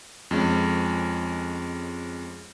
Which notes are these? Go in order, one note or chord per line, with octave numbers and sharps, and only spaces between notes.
F2 G#3 C#4